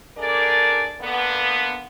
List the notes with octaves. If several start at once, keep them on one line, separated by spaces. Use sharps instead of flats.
A3 D4 G#4 A#4 D5
D3 A#3 B3